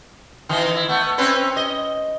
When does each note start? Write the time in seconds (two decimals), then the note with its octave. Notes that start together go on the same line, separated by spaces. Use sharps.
0.49 D#3 E3
0.75 E4
0.88 A3 B3
1.18 C4 C#4 B4
1.56 D#5